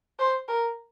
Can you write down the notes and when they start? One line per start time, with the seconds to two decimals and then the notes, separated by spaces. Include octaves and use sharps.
0.19 C5
0.48 A#4